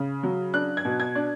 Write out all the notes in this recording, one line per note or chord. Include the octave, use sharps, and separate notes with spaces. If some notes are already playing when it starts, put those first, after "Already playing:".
Already playing: C#3
F#3
D4 F#6
G#6
B2
G#6
D4